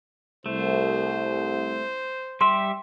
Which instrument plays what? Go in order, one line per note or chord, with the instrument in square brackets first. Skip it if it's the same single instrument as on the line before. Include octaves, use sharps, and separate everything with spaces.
[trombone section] C2 [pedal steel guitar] A3 [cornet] C5
[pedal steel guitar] G3 G4 E5 [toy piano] C6